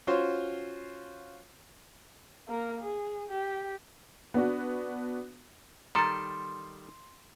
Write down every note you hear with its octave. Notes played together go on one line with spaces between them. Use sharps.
C#4 F4 F#4 C5 C#5
A#3 A#4
G#4
G4
B3 D4 F#4
D#3 G3 A4 A#5 C6 A6